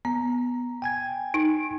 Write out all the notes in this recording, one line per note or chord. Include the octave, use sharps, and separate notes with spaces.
B3 A#5
G5 G#5 G#6
D#4